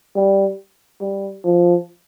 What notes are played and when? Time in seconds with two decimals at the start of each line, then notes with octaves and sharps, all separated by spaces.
0.16 G3
1.01 G3
1.45 F3